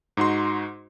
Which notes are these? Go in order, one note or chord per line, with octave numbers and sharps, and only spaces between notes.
G#2 D#4 F#4 C6